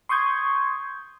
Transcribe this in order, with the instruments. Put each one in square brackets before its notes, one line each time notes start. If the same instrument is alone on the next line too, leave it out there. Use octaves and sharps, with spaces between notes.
[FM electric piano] C6 C#6 D#6 G6 G#6